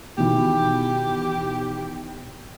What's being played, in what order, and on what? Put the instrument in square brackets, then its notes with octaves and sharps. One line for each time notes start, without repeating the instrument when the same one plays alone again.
[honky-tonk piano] B2 D#3 E3 [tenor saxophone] G4